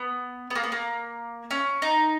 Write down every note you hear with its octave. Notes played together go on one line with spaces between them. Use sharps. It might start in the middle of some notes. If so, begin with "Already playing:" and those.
Already playing: B3
B3
A#3
B3
A#3
C#4
D#4